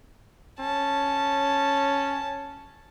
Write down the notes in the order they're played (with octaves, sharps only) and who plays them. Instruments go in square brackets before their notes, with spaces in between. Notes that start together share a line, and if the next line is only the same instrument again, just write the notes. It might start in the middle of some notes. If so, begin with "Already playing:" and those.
[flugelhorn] C#4 [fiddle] A5